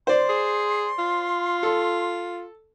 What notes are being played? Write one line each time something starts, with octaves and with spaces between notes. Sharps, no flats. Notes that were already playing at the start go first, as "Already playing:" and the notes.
C5 D5 C6
G#4
F4
A4